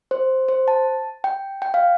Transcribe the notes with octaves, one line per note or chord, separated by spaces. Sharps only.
C5
C5
A5
G5
G5
F5